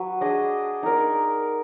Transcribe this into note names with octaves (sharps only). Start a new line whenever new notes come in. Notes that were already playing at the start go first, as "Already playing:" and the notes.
Already playing: F#3 B4
D4 G#4 D#5
D#4 A#4 D5